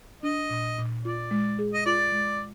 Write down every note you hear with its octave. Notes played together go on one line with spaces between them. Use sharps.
D4 D#5
A#2
A#2
F4 D5
G#3
G#4
D#5
F4 D5
G#3